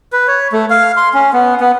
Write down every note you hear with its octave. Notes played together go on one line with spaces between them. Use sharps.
B4
C#5
A3
F5
C6
C#4
B3
B3